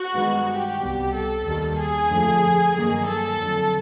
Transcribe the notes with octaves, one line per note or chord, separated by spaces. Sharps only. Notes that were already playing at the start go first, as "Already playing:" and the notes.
Already playing: F#4
G2 D#3 G#3 B3
G4
C2 B2 G3
A4
D#2 D#3 G3
G#4
F2 D3 F3 A3
G2 D#3 F#3 A#3 G#4
A4
F2 D3 F#3